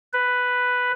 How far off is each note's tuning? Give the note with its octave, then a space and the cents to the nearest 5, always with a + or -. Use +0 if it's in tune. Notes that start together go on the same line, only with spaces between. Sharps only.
B4 +5